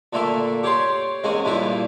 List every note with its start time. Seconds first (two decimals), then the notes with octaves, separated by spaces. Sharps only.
0.13 A#2 D3 A3 A#3 A#4 E5
0.63 G4 C#5 D5 C6
1.24 E2 G#3 A#3 C4 C#4 G#5
1.45 G2 A#2 E3 G3 A#3 E4